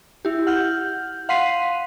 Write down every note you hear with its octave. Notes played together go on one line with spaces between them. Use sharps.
E4 G4
F#5 F6 G6
F5 F#5 C6 B6 C7 D#7